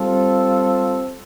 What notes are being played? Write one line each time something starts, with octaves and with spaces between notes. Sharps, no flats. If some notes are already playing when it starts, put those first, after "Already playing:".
Already playing: G3 C4 F4 A4